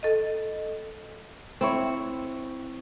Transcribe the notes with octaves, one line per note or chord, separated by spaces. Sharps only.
A4 D#5
C4 E4 C#5